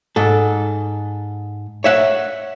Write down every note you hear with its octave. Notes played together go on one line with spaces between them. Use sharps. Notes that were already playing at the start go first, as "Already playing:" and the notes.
G#2 A4
C#5 E5 F#5